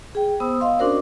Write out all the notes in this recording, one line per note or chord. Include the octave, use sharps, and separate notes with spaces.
G#4 G5
B3 C5 D#6 E6
D#5 F5 C6
C#4 D4 F#4 A#4 C5 D5